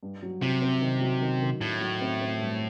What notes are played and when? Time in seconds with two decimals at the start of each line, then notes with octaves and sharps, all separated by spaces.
0.03 G2
0.22 F#3
0.42 C3 F#3
0.62 C4
0.81 D#3
1.01 F#3
1.22 D#3
1.42 D#3
1.61 A2 F#3
1.81 F#3
2.01 C4
2.21 C4
2.40 G2